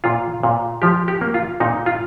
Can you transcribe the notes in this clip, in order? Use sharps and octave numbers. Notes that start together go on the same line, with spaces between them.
A#2 F4
A#2
F3 G4
G4
A#3
F4
A#2 D#4
F4